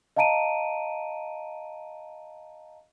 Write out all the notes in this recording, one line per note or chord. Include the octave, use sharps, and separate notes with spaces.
D#5 F5 A5 A#5 D7 D#7